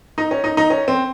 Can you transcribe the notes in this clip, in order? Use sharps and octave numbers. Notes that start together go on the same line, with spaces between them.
D#4
C#4
D#4
D#4
C#4
C4